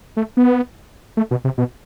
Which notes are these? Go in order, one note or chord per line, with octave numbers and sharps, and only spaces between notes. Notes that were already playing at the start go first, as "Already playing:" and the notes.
A3
B3
A3
B2
C3
B2